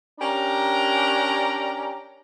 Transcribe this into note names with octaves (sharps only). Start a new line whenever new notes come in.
C#4 D4 G4 A#4 A#5